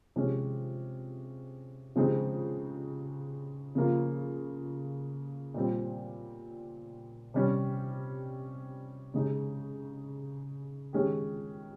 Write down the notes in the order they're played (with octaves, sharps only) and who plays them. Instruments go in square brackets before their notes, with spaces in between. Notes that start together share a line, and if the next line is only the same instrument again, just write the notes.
[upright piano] C3 F3 G#3 C#4
C#3 F3 G#3 C4 D#4
C#3 F3 A#3 F4
A#2 G3 C4
C3 G3 C#4
C#3 G#3 D#4
D#3 G#3 C#4 G4